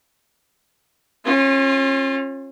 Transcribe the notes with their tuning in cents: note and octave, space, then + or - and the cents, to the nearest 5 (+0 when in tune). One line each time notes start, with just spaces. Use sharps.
C#4 -35 F4 +10